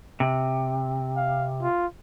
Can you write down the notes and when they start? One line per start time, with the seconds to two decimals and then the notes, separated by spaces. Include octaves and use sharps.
0.20 C3
1.17 F5
1.63 F4